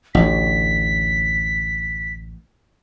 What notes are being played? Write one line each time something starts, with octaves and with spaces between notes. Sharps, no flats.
A1 D2 B6